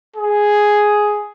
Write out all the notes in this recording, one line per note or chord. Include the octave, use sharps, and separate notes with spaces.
G#4